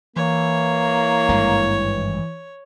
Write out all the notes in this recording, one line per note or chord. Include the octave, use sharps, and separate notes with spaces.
E3 A#3 C#5
G#1 G2 G#3